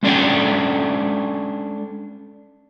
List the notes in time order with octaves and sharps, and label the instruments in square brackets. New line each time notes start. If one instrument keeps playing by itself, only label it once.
[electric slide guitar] G#3 C#4 D4 A4 G5